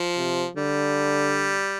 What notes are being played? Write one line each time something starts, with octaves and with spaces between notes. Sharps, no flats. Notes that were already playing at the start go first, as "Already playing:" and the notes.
Already playing: F3
C3
D3 G3